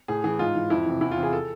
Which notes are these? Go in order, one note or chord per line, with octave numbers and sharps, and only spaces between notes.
A2 G#4
E3 G#4
G#2 F4
E3
F2 E4
C3 E3
E2 E4
F4
C3 E3
G#4
A4